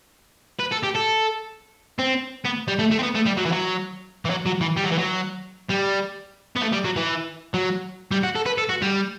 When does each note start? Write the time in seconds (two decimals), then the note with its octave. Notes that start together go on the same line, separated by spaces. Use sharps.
0.59 B4
0.72 A4
0.83 G4
0.95 A4
1.99 C4
2.45 B3
2.68 G3
2.79 A3
2.91 A3
2.99 C4
3.03 B3
3.15 A3
3.26 G3
3.37 F#3
3.46 E3
3.52 F#3
4.25 E3
4.30 F#3
4.46 F#3
4.61 E3
4.77 G3
4.84 F#3
4.91 E3
4.99 F#3
5.69 G3
6.56 B3
6.61 A3
6.73 G3
6.85 F#3
6.96 E3
7.54 F#3
8.11 G3
8.23 F#4
8.35 A4
8.46 B4
8.58 A4
8.69 F#4
8.82 G3